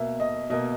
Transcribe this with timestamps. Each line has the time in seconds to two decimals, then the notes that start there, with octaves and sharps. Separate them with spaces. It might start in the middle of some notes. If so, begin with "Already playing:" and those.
Already playing: B2 A#3 E5
0.20 D#5
0.50 B2 A#3 D#5